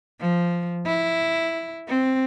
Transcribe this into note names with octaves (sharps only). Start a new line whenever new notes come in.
F3
E4
C4